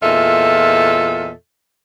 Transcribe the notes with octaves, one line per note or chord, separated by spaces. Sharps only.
E2 A#2 F4 A4 D#5 E5